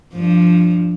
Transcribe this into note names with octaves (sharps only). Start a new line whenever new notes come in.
G2 F3